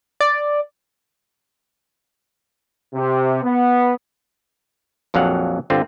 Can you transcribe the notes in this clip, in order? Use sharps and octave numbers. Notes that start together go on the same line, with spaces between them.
D5
C3
B3
A#1 F2 F#3 F5 F#5
G1 D3 C4 F4